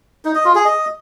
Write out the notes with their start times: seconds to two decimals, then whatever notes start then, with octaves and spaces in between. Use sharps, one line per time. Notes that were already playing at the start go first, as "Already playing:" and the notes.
0.25 D#4
0.35 D#5
0.45 F4
0.55 G#4
0.65 D#5